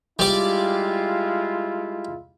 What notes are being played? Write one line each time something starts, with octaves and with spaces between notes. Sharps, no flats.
G3 G#3 E4 F4 D5